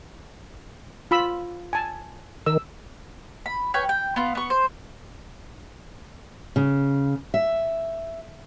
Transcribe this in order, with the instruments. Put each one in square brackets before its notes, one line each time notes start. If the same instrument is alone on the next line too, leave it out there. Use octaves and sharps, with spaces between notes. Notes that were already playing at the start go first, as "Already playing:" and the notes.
[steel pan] F4 B5 E6
G#5 A5
[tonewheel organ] D#3 [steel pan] E6
[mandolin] B5
B4 C#5 G5 G#5
G5
B3 F4
B3 C#6
C5
[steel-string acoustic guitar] C#3
E5